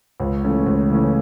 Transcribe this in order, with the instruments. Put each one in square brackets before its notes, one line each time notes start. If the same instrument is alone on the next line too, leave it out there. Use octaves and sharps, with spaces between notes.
[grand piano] C#2
C#3 E3 A3 C#4
C#2
C#3 E3 A3 C#4